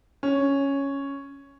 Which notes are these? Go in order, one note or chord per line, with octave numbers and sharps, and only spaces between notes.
C#4